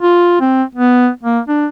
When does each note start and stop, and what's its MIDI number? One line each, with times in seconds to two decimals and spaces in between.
0.02 0.38 65
0.41 0.63 60
0.76 1.10 59
1.24 1.40 58
1.48 1.67 62